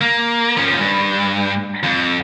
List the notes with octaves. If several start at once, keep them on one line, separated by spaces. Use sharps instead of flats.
A#3
F3 C#4
G2
F2